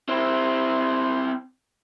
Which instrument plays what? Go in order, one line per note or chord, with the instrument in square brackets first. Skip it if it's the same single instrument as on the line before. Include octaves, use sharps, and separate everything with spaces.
[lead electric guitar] C4 E4